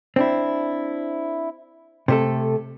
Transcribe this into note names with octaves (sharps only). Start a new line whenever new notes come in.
C4 D4 E4
C3 A3 A4